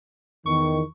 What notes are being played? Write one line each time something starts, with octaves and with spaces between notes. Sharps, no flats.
E2 D#3 C#6